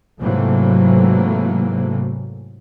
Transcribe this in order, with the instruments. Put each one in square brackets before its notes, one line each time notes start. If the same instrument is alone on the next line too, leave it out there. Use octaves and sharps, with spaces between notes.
[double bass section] G#2 C3 E3 F#3 A3 A#3